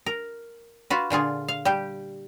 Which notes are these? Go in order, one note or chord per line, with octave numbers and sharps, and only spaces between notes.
A#4
F4 F#4 B4
A#2 D3 F4 G#4
F5
G3 G4